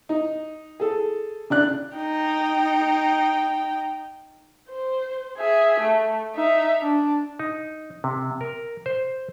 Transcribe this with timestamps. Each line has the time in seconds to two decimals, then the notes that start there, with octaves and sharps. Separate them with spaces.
0.09 D#4
0.80 G#4 A4
1.50 C#3 D4 F#6
1.96 D#4 G5
4.69 C5
5.38 G#4 E5
5.80 A3
6.35 D#4 E5
6.81 D4
7.39 D#4
8.04 C3
8.41 A#4
8.86 C5